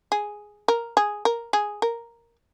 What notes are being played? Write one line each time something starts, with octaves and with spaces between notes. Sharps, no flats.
G#4
A#4
G#4
A#4
G#4
A#4